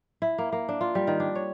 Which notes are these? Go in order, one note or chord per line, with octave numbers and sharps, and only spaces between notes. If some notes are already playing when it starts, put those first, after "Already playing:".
E4
A#3
A#3
D4
F4
G3
D#3
D4
C#5